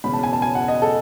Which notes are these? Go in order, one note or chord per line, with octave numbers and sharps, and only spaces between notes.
E1 E2 C#3 B5
A5
G#5
A5
G#5
F#5
D#5
A4